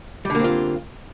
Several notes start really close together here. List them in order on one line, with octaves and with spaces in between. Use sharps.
G3 D3 A#3 C4 F4